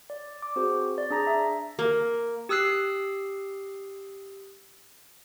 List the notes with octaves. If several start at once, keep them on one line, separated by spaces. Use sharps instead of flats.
D5
D6
C4 F#4 G#4 C5
D5
D4 G#4 A#5 A#6
E5
A#3
G4 D#6 E6 F#6 C7